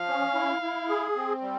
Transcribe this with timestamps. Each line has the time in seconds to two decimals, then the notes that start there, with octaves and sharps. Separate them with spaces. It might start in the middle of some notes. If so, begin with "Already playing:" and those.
Already playing: F3 F5
0.08 C#4
0.35 E4
0.62 E4
0.88 G#4
1.16 C4
1.42 G3